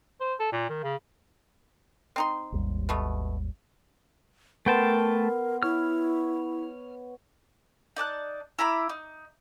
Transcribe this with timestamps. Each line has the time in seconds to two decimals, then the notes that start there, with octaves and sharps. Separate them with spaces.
0.20 C5
0.40 A4
0.52 A#2
0.69 D#3
0.83 C#3
2.16 C4 D#4 C6
2.52 G#1 D#2 G3
2.89 B2 A3 B3
4.66 A3 B3 A#4 G5 A5 C6
5.63 E4 C#5 F6
7.96 D#4 D5 A5 F#6
8.59 E4 A#5 B5 D6
8.89 D#4